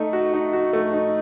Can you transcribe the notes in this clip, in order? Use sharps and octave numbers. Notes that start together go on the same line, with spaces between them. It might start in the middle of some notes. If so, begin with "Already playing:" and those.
Already playing: A3 D#4
F#4
D#4
F#4
A3
D#4